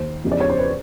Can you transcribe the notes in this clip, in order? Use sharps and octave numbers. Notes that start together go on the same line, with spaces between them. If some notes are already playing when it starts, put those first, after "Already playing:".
Already playing: D#2 D#3 C5
E2 C#3 F3
D5
C#5
C5
B4